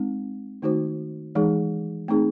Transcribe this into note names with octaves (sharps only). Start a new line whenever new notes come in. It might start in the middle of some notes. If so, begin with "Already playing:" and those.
Already playing: G#3 C4 D#4
D#3 A3 D#4 F#4 C5
E3 G#3 D#4 G#4
A3 C4 D#4 G#4